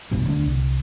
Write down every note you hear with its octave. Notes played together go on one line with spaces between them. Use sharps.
F1 B1 G2 B2
D2 D3 A#3 D4
C2